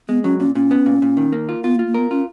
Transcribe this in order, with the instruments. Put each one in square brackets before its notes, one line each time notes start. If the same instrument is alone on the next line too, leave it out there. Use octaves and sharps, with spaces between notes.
[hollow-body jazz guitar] G#3 [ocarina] B3
[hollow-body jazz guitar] F#3 [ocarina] C#4
[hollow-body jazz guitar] A#2 [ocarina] C#4
[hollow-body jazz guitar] A#2 [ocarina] C#4
[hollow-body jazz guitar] B3
A#2
A#2
D#3
A#3
F4
[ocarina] B3 [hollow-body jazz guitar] F4
[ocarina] A#3
[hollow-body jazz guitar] F4
[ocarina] A#3
[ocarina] B3 [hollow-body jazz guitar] A#4
[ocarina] C#4 [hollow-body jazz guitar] F4